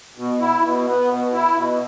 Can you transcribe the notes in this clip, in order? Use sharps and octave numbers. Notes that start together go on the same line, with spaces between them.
B2
E4
B2
B3
B2
E4
B2